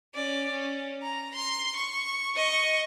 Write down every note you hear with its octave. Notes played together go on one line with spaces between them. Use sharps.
C#4 D5
C#4
A#5
C6
C#6
D#5 C#6